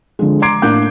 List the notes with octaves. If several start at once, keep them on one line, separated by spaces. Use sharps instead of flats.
D3 F3 G#3
A#5 C6 D6 G#6 C7 D7
A2 A#3 D4 D6 F#6 G6